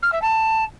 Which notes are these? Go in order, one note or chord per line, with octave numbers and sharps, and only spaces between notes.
F6
E5
A5